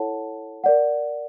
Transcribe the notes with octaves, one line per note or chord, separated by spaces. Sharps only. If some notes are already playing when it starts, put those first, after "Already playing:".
Already playing: E4 A4 C#5 F#5 A5
A#4 D5 F#5